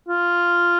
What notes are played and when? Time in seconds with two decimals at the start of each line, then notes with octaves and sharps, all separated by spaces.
0.08 F4